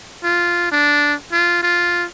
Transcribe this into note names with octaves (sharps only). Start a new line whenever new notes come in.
F4
D4
F4
F4